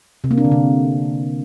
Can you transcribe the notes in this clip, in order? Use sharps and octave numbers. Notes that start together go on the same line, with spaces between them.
C3
A#3
D4
D3
C3